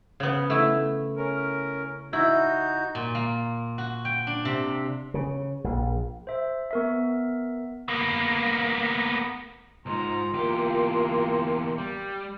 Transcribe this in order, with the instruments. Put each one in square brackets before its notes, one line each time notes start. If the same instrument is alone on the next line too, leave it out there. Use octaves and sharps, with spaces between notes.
[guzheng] C#3 B3
A3 E4
[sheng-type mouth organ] C#4 A#4
[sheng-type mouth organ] D#4 F#4 G6 [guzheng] E4
[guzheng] A#2
A#3
F#4
G5
D4
C3
[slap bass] C#3
A#1
[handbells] C5 E5
B3 A#4 E5
[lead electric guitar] A#3 B3
[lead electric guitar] B1 G#2 [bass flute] F4 [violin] A#5 [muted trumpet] C6
[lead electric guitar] E2 G4 [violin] A#3
[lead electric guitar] G3